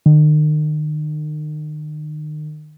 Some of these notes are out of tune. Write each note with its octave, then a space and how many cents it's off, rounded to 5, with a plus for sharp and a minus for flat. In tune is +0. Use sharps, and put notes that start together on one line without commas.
D#3 -40